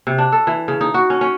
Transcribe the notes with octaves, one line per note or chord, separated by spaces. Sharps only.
C3
D4
A4
E3
C#3
D#4
F#4
C#4
C#4